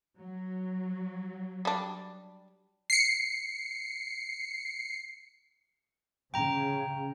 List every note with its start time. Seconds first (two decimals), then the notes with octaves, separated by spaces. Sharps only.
0.19 F#3
1.65 G3 D4
2.90 C7 C#7
6.34 C#3 G5 A#5